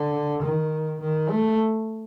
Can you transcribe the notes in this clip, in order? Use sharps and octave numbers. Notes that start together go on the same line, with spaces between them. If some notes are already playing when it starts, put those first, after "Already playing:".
Already playing: D3
D#3
D#3
A3